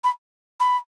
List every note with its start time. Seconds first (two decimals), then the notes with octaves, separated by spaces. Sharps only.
0.04 B5
0.60 B5